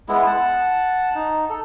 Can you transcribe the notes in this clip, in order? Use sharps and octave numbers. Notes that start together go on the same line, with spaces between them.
G#3 B3 E4
F#5 A5
D#4
A4